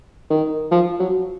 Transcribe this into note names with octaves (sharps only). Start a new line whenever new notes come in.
D#3
F3
F#3